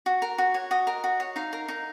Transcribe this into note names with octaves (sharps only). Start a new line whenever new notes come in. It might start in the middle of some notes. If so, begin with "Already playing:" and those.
F#4
A#4
F#4
C#5
F#4 D#5
A#4
F#4
C#5
D#4 F5
A#4
D#4